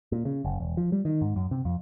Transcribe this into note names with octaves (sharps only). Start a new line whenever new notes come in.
A#2
C#3
F#1
E1
F3
G3
D#3
G#2
F#2
C3
F2